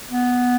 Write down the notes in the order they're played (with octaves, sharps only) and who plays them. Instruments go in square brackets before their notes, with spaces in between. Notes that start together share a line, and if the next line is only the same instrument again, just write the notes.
[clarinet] B3